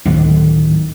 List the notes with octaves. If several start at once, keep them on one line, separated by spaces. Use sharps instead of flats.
D1 D#3